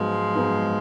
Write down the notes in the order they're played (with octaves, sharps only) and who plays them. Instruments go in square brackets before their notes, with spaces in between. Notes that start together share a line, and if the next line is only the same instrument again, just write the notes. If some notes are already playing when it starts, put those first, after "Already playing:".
Already playing: [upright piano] G#2 F#3 B3 [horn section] F3 G#3
[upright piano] G#2 F#3 B3